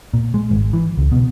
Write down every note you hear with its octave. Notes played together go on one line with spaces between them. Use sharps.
A#2
G#3
G#1
E3
C#2
B2